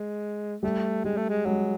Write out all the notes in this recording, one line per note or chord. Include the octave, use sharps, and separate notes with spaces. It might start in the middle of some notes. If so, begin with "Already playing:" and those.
Already playing: G#3
G3 A3
G3 G#3
A3
G#3
F#3 G#3